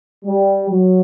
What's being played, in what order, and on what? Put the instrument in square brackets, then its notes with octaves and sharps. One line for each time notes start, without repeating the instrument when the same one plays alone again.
[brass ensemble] G3
F#3